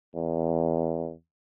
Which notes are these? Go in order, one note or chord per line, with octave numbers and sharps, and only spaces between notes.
E2